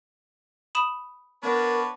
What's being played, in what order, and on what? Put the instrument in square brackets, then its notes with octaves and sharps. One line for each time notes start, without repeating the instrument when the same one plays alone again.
[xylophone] B5 D#6 E7
[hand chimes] B3 F#5 A#6 [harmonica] D4 B4 C#5 [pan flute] A#4